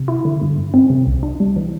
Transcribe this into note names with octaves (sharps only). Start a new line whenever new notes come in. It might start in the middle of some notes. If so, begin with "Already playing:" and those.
Already playing: C3
E4
D3
G2
G2
C4
C3
C2
D4
G3
E3